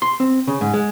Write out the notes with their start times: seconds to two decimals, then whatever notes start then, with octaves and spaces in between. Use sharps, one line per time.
0.02 C6
0.20 C4
0.47 C#3
0.61 G#2
0.74 G#3